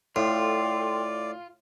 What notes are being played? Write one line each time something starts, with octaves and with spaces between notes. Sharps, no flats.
A2 F4 A4 D5 G5 C6